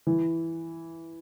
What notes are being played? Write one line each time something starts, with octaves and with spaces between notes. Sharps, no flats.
E3